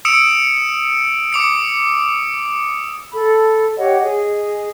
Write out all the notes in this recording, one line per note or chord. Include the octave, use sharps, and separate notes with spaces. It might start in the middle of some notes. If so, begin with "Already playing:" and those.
D#6 E6 C#7 D7 E7
D6 D#6 C#7
A4 B5
G4 C#5 D#5 F#5
G#4 D#5